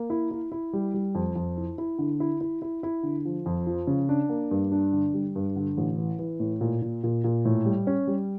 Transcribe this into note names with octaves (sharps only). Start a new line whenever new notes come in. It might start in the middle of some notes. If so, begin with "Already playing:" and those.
Already playing: A#3
E4
E4
E4
G3
G3
F2
F2
E4
E4
D3
E4
E4
E4
E4
D3
F3
F2
F3
C#3
D4
A#3
G2
D4
D3
G3
G2
D3
A1
E3
E3
A2
A#2
A#2
A#2
A#2
A2
G3
C#4
G3